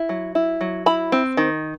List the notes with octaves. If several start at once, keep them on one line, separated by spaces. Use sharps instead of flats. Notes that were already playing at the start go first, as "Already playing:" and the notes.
Already playing: E4
F#3
E4
F#3
E4 B5
C4
D#3